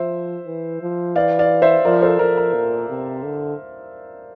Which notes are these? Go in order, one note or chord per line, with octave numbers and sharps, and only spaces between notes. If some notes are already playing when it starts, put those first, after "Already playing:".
Already playing: F3 C5 E5
E3
F3
E3 D5 F5
D5 F5
C5 E5
F3 A#4 D5
A4 C5
F3 A#4
A#4
A#2
C3
D3